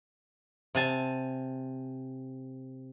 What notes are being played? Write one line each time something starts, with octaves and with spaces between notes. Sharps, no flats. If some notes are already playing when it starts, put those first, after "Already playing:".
C3 G#5 A5